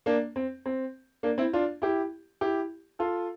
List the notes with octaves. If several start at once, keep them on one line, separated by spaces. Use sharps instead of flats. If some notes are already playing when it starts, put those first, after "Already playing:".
A#3 D4
C4
C4
A#3 D4
C4 E4
D4 F4
E4 G4
E4 G4
F4 A4